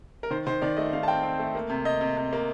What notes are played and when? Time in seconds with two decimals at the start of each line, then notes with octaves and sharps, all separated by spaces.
0.23 A#4
0.30 D#3 C5
0.47 D#3 C5
0.62 D#3 D5
0.77 A3 D#5
0.93 D#3 F5
1.03 A5
1.08 C4 G5
1.23 C4
1.39 A3
1.55 A#3
1.70 C3
1.85 C3 D#5
2.01 C3
2.17 C3
2.33 A#3